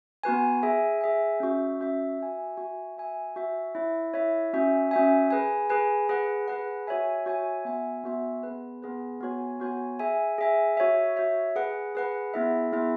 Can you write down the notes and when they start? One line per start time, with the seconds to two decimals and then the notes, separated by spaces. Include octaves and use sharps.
0.23 B3 F#4 B4 G#5
0.63 G#4 E5 G#5
1.01 G#4 E5 G#5
1.40 C#4 F#4 E5
1.80 C#4 F#4 E5
2.19 F#4 E5 G#5
2.57 F#4 E5 G#5
2.97 F#4 E5 G#5
3.36 F#4 E5 G#5
3.75 E4 C#5 E5
4.14 E4 C#5 E5
4.53 C#4 F#4 E5 G#5
4.91 C#4 F#4 E5 G#5
5.31 G#4 B4 G#5
5.70 G#4 B4 G#5
6.09 G#4 B4 F#5
6.48 G#4 B4 F#5
6.87 F#4 C#5 E5 G#5
7.26 F#4 C#5 E5 G#5
7.65 B3 F#4 E5 G#5
8.04 B3 F#4 E5 G#5
8.43 B3 G#4 B4
8.82 B3 G#4 B4
9.21 B3 F#4 C#5 G#5
9.60 B3 F#4 C#5 G#5
9.99 G#4 E5 G#5
10.38 G#4 E5 G#5
10.77 F#4 C#5 E5
11.16 F#4 C#5 E5
11.56 G#4 B4 F#5
11.95 G#4 B4 F#5
12.34 B3 E4 G#4 E5
12.73 B3 E4 G#4 E5